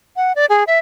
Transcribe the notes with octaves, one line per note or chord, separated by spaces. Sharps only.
F#5
D5
G#4
E5